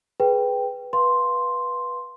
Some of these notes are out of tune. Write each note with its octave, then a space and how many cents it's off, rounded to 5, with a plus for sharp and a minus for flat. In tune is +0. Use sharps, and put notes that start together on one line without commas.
G#4 +15 B4 +0 G5 +0
B4 -15 F5 +0 C6 +0